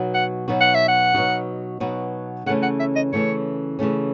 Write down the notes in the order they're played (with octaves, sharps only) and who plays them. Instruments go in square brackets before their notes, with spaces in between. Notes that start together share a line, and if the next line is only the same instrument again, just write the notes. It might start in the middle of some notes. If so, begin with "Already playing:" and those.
Already playing: [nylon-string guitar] B2 F#3 B3 D#4 F#4
[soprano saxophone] F#5
[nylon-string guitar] B2 F#3 B3 D#4 F#4
[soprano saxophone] F#5
E5
F#5
[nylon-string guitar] B2 F#3 B3 D#4 F#4
B2 F#3 B3 D#4 F#4
[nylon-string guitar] C#3 E3 A3 C#4 [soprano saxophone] F#5
[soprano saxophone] F#5
E5
D#5
[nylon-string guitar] C#3 E3 A3 C#4 [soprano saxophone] C#5
[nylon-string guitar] C#3 E3 A3 C#4